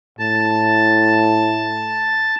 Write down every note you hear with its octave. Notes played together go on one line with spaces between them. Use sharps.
A2 A5